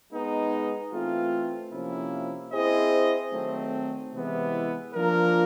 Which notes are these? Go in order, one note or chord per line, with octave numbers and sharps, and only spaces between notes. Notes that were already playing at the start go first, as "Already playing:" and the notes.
G#3 B3 D#4
E3 A3 C4 F4
C3 F3 A#3 C#4 E4
C4 E4 G#4 C5 D#5
D#3 F#3 A3 C4
C3 E3 G#3 B3 E4
F3 A#3 D4 F4 A#4